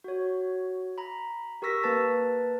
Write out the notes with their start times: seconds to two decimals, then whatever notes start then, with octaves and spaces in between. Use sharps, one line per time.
0.04 F#4 C#5
0.98 A#5 B5
1.62 G4 A#4 C#6 E6 A#6 B6
1.83 A#3 A#4 B4 A5 A6